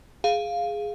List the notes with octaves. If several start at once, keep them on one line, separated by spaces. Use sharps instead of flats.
G#4 F5